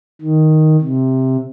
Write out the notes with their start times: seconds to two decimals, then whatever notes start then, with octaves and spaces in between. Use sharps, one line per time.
0.21 D#3
0.82 C3